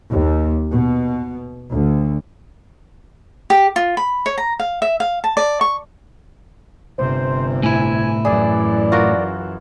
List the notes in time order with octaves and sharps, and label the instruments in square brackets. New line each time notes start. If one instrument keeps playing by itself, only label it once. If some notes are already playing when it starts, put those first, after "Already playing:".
[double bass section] D#2
B2
D2
[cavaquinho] G4
F4
B5
C#5
A#5
F5
E5
F5
A5
D5
C#6
[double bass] G1 C3 [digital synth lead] C5
[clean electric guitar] A2 E4 [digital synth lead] G#5
[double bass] F#2 E3 [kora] G#4 [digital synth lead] D5
[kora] F4 F#4 A#4